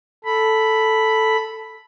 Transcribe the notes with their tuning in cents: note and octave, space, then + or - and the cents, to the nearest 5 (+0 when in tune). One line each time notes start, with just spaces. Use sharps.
A4 +0 B5 +0